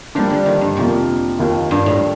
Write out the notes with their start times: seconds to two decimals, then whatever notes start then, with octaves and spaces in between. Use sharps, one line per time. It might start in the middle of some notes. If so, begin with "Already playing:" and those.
0.15 F3 G3 A#3 D4
0.30 D3
0.46 D#3
0.61 G2
0.77 F2 C3 F3 A#3
1.39 D#2 D#3 A#3 F4
1.71 G2
1.86 A2